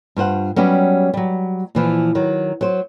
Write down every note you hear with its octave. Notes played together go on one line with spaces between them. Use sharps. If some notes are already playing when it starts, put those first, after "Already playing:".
G2 F4 C5 F#5
F#3 G3 B3 C#4 G4
F#3 G3
A#2 E3 F3
D#3 F#3
F#3 C5